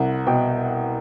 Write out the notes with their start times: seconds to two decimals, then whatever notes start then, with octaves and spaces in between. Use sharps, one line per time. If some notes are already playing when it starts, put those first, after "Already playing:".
Already playing: C2 F#5
0.27 B2 G5